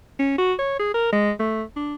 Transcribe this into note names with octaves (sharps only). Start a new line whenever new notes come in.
C#4
F#4
C#5
G#4
A#4
G#3
A3
D4